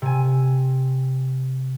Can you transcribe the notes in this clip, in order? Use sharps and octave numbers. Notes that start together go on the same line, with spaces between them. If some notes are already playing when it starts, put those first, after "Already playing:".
C3 G#5